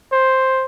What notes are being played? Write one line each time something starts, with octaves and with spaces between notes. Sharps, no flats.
C5